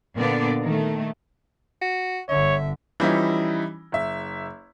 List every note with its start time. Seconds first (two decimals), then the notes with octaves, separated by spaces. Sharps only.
0.16 A#2 D3 B3 D5
0.62 D#3 A3
1.82 F#4
2.29 G1 D3 C#5 E5
3.00 E3 F3 G3 C#4 D#4 E4
3.92 F#1 E5